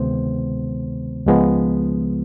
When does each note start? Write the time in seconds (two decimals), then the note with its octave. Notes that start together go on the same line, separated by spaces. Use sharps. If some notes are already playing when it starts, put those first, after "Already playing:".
Already playing: D2 C3 D#3 G#3 B3 C5
1.26 C#2 C#3 F3 G#3 B3